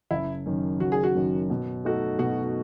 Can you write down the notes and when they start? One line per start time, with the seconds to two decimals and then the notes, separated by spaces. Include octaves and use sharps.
0.11 F#1 E4
0.46 F#2 D#3
0.80 F#1 F#4
0.92 G#4
1.03 F#4
1.15 F#2 D#3
1.50 B2
1.85 A3 D#4 F#4 A4
2.19 B2 F#4